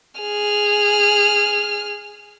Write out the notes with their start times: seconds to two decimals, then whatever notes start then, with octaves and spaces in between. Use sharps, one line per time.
0.21 G#4 F6